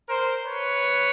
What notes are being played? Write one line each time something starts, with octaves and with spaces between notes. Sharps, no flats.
A#4 C5
B4 C#5